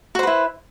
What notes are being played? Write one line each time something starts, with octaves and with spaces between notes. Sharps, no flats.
E4 F#4 B4 C5